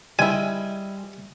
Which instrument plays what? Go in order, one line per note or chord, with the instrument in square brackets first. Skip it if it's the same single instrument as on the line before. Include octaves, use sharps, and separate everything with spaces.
[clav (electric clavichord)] G3 [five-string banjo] G#3 E4 [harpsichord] G#5